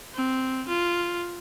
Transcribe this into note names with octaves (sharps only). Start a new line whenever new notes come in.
C4
F4